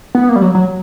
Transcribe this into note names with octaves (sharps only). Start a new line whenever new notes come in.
B3
A#3
G3
F#3
F#3